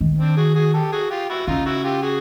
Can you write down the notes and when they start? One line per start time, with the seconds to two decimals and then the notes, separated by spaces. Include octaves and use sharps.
0.01 D#3
0.18 C4 D4
0.37 F#4 G#4
0.55 F#4 G#4
0.74 G4 A4
0.92 F#4 G#4
1.10 F4 G4
1.30 E4 F#4
1.47 C#3 D#4 F4
1.66 E4 F#4
1.84 F4 G4
2.02 F#4 G#4